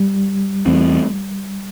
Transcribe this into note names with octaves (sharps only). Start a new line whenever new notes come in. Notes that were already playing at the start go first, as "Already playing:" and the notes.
Already playing: G3
E2 E3 A3 C4